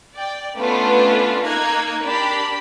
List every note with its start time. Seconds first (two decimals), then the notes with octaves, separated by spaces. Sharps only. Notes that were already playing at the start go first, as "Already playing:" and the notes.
0.16 D5 G5
0.59 A3 B3 C#4 D4 F4 B4
1.44 A#3 D#4 F#6 G#6
2.04 D4 G4 A#4 B5